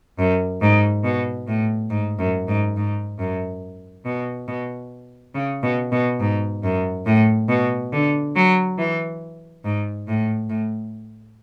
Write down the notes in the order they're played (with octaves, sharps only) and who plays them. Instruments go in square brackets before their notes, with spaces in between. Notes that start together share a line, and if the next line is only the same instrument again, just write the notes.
[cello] F#2
G#2
B2
A2
G#2
F#2
G#2
G#2
F#2
B2
B2
C#3
B2
B2
G#2
F#2
A2
B2
D3
F#3
E3
G#2
A2
A2